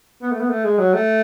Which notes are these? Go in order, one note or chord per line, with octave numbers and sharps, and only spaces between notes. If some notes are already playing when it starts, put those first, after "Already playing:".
B3
A3
B3
A3
G#3
F#3
A3